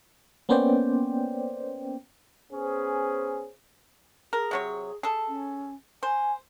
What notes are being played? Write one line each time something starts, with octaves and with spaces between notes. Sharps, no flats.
A#3 B3 C#4 C5 D5 G5
B3 C#4 G#4 C5
G#4 A#4
C3 F#3 C#5
G#4 A4
C#4
C5 G#5